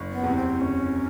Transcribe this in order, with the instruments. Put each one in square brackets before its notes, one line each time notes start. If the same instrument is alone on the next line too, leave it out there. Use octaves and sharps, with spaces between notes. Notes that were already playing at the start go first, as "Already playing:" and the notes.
Already playing: [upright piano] F#1
[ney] B3
[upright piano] E2 C3
[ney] C4
[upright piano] F#1 [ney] C#4